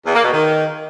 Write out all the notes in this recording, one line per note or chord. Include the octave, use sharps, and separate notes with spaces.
E2
A#3
B2
D#3